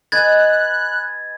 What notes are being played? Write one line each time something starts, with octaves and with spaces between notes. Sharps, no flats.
B4 D#5 G#5 F#6 G#6 A6